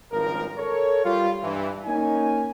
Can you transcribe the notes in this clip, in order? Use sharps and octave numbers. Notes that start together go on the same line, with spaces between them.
G#1 C#2 G2 F3 A#4
A4 A#4 C#5
G3 F4
G2 E3
A#3 C#4 D#4 G#5